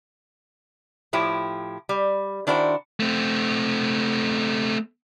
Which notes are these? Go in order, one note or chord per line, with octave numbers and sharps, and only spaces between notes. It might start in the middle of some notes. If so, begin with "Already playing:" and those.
A2 F3 E4 G4
G3
D#3 D4 E4 F#4 A#4 C5
A3 C4